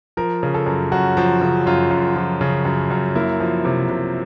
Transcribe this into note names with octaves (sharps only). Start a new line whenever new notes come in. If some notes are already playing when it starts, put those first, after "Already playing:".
F3 A#4
C#3
A4
F#2
F#2 F#4
F3
C#3
F#2 F4
F#2
F3
C#3
F#2
F#2
A#3 E4
F3
C3
C3